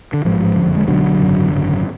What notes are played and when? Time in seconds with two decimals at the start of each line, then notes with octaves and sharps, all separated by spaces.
0.13 D3
0.25 A1 G#2 F3
0.56 F#1 F2 D3
0.76 G#3
0.87 B1 B2 D3 F#3
1.19 G#1 F#2 C#3
1.51 G#1 F#2 C#3